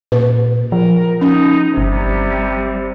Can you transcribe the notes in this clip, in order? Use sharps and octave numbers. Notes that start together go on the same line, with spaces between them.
A#2 B4
F3 A#4
C#4 D#4
G1 C3 G3